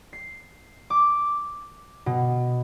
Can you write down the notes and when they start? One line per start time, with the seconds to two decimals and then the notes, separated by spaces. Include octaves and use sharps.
0.13 C7
0.90 D6
2.06 B2